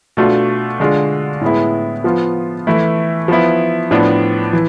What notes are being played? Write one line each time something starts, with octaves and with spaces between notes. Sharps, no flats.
B2 A3 D4 F4
D3 G#3 D4 F4
A2 G#3 B3 E4
F3 B3 F4
E3 A3 E4
F3 B3 E4
A2 F3 B3 D4
E3